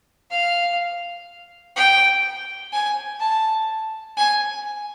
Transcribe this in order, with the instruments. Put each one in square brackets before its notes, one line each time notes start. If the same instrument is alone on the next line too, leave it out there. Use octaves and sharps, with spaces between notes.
[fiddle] F5
G5
G#5
A5
G#5